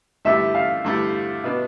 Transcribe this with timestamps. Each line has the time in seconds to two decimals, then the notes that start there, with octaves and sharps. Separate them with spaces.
0.25 G2 D3 A3 E4 G4 E5
0.55 F5
0.84 G2 D3 A3 E4 G4
1.44 B2 B3 D4